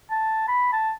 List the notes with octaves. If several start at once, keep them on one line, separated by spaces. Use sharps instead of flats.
A5
B5
A5